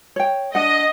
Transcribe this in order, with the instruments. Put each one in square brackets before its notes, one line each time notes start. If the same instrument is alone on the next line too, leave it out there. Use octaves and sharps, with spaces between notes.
[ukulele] C#5 G5
[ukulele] D4 F#5 [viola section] D#5